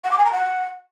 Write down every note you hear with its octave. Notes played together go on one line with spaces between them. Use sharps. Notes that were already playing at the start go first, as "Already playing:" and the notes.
F#5
D6
G#5
A#5
F#5